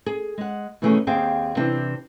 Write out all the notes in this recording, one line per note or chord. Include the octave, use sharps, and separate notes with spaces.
G#4
G#3 F#5
B2 D#3 E3 A3 C#4 G#4
D#2 C4 G#4 F5 G5
C3 E3 C4 D4